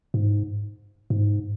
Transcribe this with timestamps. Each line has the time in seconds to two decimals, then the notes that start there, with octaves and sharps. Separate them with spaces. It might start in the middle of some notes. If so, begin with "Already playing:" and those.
0.14 G#2
1.10 G#2